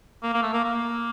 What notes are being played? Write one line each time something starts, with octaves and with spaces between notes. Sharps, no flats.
A#3
A#3
A3
A#3
A#3